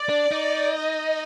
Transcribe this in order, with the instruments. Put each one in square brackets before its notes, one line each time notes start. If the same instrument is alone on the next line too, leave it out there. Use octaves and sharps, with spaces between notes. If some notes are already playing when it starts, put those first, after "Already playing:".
Already playing: [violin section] D5
[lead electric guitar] D4
D#4
[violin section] D#5